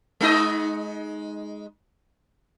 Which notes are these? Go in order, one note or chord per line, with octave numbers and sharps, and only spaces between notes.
G#3 D#4 D#5